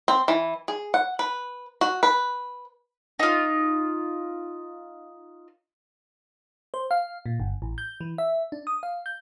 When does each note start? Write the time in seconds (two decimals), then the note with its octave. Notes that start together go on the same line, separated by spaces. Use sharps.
0.08 C4
0.28 E3
0.68 G#4
0.94 F#5
1.19 B4
1.81 F#4
2.03 B4
3.19 D#4 F4
6.74 C5
6.91 F5
7.26 A#2
7.40 G1
7.62 A1
7.78 G6
8.01 E3
8.18 E5
8.52 D4
8.67 D#6
8.83 F5
9.06 G6